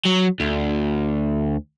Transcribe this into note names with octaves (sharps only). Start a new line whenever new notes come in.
F#3
D2